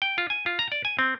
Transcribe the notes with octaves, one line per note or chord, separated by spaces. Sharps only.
G5
F4
G#5
F4
A#5
D5
G#5
C4